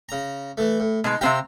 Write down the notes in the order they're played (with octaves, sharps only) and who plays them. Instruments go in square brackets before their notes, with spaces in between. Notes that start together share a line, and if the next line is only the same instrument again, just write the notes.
[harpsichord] C#3 A#5
E3 A3
A2
[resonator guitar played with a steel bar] B2 G#3 [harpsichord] D#4
[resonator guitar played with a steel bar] C3 C4 G4 [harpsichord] F5 G5 A#5